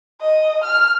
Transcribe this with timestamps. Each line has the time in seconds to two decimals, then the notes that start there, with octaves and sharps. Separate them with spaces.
0.21 D#5
0.64 F6